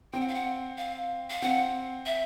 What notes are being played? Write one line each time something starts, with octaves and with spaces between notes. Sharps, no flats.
C4 G5
F#5
F5
F#5
F5
F5
C4 F#5
E5